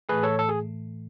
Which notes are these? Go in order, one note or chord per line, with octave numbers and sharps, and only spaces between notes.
A2 E3 A3 G#4 B4
A4 C#5
A4
G#4